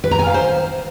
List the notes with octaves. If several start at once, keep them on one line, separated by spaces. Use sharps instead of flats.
B4
A#5
G#5
F5
C5